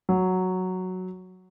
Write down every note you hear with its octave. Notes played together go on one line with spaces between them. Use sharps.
F#3